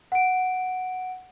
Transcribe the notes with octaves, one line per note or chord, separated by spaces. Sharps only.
F#5 D7